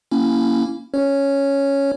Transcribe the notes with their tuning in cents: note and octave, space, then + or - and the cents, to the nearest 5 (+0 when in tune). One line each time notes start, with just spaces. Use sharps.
A#3 +0 C#4 +0 E4 +5
C#4 +0 C#5 +0